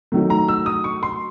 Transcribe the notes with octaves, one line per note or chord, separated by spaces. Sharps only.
D#3 F#3 A3
A#5
E6
D#6
C#6
C6